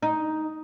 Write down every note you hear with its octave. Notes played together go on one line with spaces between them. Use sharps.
D#4